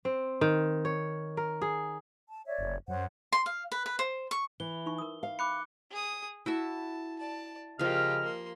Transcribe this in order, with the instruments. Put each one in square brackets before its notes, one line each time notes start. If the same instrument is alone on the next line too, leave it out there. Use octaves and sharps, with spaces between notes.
[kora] C4
D#3
C#5
A#4
G#4
[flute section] A5
C#5 D5 E5
[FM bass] F#1
[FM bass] F#2 [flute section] C5 C#5 F#5
[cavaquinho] C6
F5
B4
B4
C5
C#6
[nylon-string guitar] E3 [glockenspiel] G7
[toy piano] D#4 C#6
A#4 D#6
[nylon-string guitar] F5
[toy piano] B5 [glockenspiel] D6 F#6 C#7
[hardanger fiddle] G#4 D#6
[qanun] E4 F#4 E5 [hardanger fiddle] A5
[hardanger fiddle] D5 A5
[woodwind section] C#3 D#5 F6 [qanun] F3 F5 [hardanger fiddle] A#3 G4
[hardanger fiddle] A#3 C6